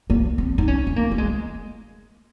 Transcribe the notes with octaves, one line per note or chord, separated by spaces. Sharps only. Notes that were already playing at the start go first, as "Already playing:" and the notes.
A#3
C4
D#4
C#4
C4
A#3
A#3
G#3